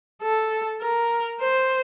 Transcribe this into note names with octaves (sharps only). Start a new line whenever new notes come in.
A4
A#4
C5